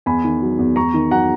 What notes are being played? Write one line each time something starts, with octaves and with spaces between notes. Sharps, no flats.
E2 G#5 B5
D#3
F#3
E2
E2 A#5 C#6
D#3
F#3 F#5 A#5